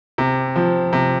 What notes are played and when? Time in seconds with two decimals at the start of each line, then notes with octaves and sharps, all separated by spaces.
0.18 C3
0.56 F3
0.93 C3